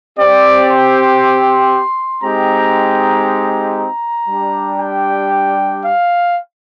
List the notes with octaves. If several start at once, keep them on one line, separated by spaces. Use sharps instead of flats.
C4 G4 D5
C6
G#3 C4 D#4 G4 A#5
A#5
G3 D4 G4
G5
F5